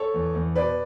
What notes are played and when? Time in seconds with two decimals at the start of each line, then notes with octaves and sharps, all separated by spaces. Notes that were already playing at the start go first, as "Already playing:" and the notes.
Already playing: A4 C#5
0.14 E2
0.35 E2
0.55 B2 B4 D5